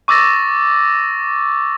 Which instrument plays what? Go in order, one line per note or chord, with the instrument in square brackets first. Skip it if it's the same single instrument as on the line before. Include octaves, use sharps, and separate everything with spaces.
[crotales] C#6 D6 E6 A6 A#6